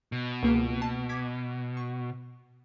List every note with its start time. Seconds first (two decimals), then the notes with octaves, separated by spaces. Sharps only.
0.12 B2
0.43 C#2 A#3 D7
0.82 A5
1.09 D6 G#6 B6
1.77 C#6